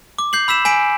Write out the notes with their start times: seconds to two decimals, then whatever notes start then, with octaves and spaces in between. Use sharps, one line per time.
0.19 D6
0.33 G6 C7 F#7
0.48 B5 E6 B6 E7
0.65 G#5 B6 D7